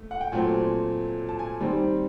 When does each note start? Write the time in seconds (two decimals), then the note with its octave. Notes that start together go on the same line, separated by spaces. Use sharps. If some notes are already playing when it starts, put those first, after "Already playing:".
Already playing: A3
0.11 F#5
0.21 G5
0.32 A#2 F#3 A3 C4 G#5
1.29 A5
1.39 G#5
1.60 D#3 G3 C4